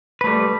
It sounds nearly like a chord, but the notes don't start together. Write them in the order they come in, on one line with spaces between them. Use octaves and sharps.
B4 A3 G3